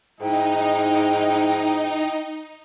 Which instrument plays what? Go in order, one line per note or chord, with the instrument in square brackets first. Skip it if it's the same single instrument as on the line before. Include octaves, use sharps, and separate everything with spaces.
[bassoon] G#2 [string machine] D#4 [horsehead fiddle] E4 G5